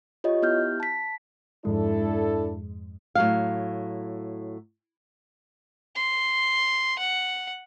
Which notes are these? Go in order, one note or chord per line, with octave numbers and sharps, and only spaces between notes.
F4 G4 C#5 D#5
B3 E4 G4 F6 G6
A5 B6
F2 G#2 G#3 D4 E4 A4
A2 F#3 F5
C6
F#5